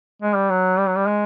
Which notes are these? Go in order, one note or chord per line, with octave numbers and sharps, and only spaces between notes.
G#3
G3
F#3
G3
F#3
G3
G#3